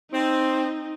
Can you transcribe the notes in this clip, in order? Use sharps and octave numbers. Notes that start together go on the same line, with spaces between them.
C4 D#4